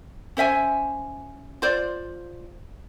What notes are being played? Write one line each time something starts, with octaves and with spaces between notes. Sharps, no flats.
C#4 C5 E5 G#5
F4 C5 D5